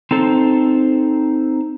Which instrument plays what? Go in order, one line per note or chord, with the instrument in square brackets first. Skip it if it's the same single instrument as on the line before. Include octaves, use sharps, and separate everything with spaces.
[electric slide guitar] C4 D#4 A4 C5